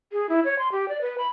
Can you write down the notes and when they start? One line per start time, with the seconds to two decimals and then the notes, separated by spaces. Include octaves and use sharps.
0.12 G#4
0.29 E4
0.45 C#5
0.59 C6
0.72 G4
0.89 D5
1.01 B4
1.18 B5